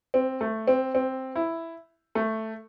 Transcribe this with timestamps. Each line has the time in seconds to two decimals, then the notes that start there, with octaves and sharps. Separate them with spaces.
0.14 C4
0.41 A3
0.67 C4
0.95 C4
1.36 E4
2.15 A3